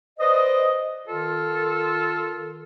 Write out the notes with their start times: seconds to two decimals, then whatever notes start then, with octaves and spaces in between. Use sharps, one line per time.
0.20 B4 C5 D5 D#5
1.07 D#3 F4 A4